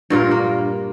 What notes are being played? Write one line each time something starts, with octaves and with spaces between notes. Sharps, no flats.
G2 A#2 F4 A#4
A#3